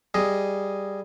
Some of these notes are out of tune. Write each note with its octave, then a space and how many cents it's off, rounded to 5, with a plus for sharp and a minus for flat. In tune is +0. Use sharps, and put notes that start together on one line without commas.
G3 +0 G#4 +0 D#5 +0